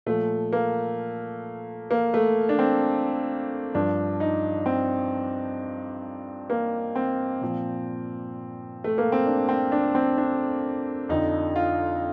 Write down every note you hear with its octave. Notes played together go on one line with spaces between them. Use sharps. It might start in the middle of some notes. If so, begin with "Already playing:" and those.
A#2 F3 A3
A#3
A#3
A3
D4
C4
G2 F3 D4
D#4
C4
A#3
C4
A#2 F3
A3
A#3
C4
D4
C4
D4
C4
D4
F2 D3 F3 D#4
F4